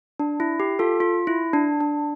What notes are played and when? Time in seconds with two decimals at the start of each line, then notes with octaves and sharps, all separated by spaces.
0.20 D4
0.40 E4
0.60 G4
0.79 F4 A4
1.00 F4
1.27 E4
1.53 D4
1.80 D4